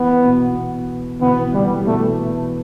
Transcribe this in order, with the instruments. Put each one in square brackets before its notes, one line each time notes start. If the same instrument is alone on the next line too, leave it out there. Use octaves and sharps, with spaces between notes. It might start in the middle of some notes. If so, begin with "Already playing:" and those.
Already playing: [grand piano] E3 [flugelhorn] B3
[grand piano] B2
[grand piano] B2 E3 [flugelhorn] B3
[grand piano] E3 A3 [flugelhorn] G3
[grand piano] B2 E3 [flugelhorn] A3